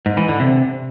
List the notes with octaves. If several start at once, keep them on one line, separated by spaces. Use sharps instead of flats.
G#2
E3
D3
C3